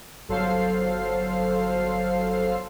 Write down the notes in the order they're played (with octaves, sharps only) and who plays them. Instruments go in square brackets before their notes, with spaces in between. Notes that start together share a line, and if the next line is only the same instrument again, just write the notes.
[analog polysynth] G1 F#3 A4 C5 F5 C7